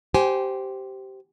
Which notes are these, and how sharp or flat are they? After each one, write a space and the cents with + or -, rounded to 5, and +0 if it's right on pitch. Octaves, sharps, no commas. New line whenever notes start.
G4 -15 C5 +0 G#5 +5